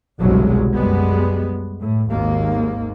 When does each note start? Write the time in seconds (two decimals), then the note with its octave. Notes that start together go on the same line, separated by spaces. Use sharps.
0.20 G1 C2 B2 F#3 G#3
0.74 F#2 G3 G#3 B3
1.80 A2
2.11 G#1 D#2 G#2 A#3